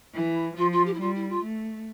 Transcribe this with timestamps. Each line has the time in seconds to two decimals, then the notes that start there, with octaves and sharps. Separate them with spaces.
0.14 E3 E4
0.57 F3 F4
0.72 F4
0.86 G4
0.93 E4
1.00 G3 F4
1.15 E4
1.29 F4
1.43 A3